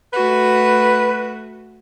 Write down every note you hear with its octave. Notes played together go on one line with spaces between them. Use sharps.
A3 F#4 B4